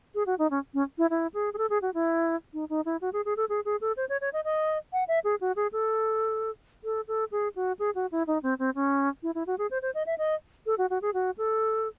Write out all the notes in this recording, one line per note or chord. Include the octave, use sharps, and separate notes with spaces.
G#4
F#4
D#4
C#4
C#4
E4
E4
G#4
G#4
A4
G#4
F#4
E4
D#4
D#4
E4
F#4
G#4
G#4
A4
G#4
G#4
A4
C5
C#5
C#5
D#5
D#5
F#5
E5
G#4
F#4
G#4
A4
A4
A4
G#4
F#4
G#4
F#4
E4
D#4
C4
C4
C#4
E4
E4
F#4
G#4
C5
C5
D#5
E5
D#5
A4
F#4
F#4
G#4
F#4
A4